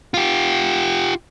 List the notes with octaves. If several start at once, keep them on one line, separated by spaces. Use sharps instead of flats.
F4 G4